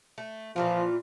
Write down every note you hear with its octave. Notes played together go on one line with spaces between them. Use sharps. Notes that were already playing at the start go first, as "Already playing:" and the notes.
A3
A#2 E3 F3 F4